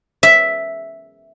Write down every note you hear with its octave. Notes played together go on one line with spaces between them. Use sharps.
E5